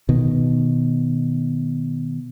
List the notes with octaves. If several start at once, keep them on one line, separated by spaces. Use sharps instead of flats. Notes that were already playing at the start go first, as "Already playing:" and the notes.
B2 D#3